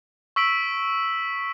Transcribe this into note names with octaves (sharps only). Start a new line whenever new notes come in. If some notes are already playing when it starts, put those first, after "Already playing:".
C#6 E6 B6 D7 F#7